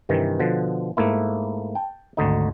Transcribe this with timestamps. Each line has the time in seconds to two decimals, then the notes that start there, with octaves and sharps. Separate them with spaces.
0.09 G2 C3 D#3 E3
0.39 B2 D3 F3
0.97 G#2 A3 A#3 E4
1.75 G5 A5
2.17 G#1 D2 D3 D#4